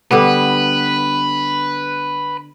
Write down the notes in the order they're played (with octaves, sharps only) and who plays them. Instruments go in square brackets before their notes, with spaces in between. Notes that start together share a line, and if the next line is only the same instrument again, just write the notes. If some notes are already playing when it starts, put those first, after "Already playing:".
[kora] D3 G3 B3 [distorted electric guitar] B4